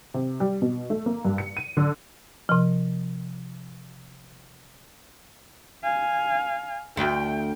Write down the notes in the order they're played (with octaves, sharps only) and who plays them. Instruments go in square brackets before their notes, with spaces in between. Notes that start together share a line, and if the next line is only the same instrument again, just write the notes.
[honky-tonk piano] C3
G3
B2
A3
A#3
G2
C#7
D#7
D3
[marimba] C3 F3
[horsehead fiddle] F5 G#5
[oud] D2 [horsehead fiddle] G5